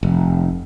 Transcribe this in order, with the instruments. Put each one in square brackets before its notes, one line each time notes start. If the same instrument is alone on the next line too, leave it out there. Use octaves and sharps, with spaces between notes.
[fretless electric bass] F1